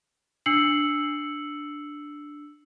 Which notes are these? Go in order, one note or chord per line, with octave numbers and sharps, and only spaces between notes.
D4 E6 C7 C#7 F#7